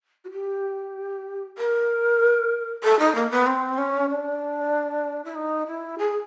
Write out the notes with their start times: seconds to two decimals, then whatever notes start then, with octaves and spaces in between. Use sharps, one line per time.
0.24 F#4
0.31 G4
1.58 A#4
2.83 A4
2.99 D#4
3.15 A#3
3.31 B3
3.46 C4
3.78 C#4
4.10 D4
5.25 E4
5.35 D#4
5.67 E4
5.98 G#4